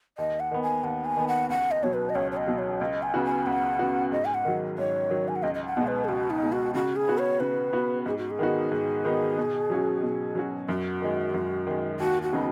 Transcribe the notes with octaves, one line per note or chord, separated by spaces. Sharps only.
D#2 D#5
F#5
D#3 B3
G#5
D#2 F#5
G#5
D#3 B3
F#5
C#2 F#5
D#5
B2 F#3 C#5
B4
D#5
C#2 C#5
C#5
D#5
B2 F#3
C#5
C#2 D#5
G#5
C#3 B3 F#4
G#5
C#2 F#5
C#3 B3 F#4
G#2 D#5
G#5
F#5
D#3 F#3
G#2 C#5
D#3 F#3
G#5
F#5
C#2 D#5
D#5
F#5
B2 G#3
B4
G#4
C#2 F#4
D#4
B2 G#3
F#4
C#3 F#4
G#4
B3 F#4
C#5
C#3 B4
B3 F#4
G#2 G#4
F#4
G#4
D#3 B3 D#4 F#4
G#2
D#3 B3 D#4 F#4
B2
F#3 C#4 F#4
B2
F#3 C#4 F#4
F#2 F#4
D#3 G#3
F#2
D#3 G#3
D#2 F#4
F#4
C#3 F#3 B3 D#4